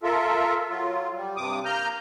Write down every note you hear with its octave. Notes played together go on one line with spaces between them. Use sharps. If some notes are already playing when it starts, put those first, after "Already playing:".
F4 A4 A#4 E5
F#3 F4
G3
G2 C3 D6 D#6
A#3 A#5 F6 G6